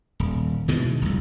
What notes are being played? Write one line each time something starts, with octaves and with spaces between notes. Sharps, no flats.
D#1
B2 D#3 E3 G#3
F1 C2